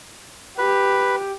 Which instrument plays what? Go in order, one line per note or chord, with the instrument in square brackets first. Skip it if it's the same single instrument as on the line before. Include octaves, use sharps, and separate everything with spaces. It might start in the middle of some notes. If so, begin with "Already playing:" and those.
[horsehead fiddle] G4 [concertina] B4